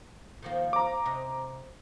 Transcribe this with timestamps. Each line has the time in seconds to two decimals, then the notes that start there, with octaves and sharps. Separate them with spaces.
0.43 D#3 F3 A#3
0.73 A#5 D6
1.05 C3 D#5